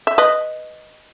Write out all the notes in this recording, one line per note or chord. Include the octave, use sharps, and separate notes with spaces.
E5
B4 D#5